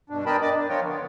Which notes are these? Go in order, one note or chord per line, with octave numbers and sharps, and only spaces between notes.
G2 B2 D4
D4 A#4 D#5 G5 A5 B5
D5 D#5 D6
D4
F3 F4 A#4 C#5 G5
D3 B3